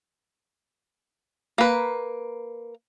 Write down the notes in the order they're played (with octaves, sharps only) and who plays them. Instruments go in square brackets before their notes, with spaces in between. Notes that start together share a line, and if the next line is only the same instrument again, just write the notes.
[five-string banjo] A#3 B4